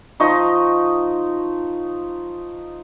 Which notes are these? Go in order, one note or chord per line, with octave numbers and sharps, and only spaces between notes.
F3 D#4 D#5 C#6